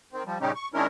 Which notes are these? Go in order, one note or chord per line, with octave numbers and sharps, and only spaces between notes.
D#3 C4
F3 G3
A#2 C#3 G3 C#4 D#4 G4
C#6
D#3 G#3 C#4 D4 E4 A#4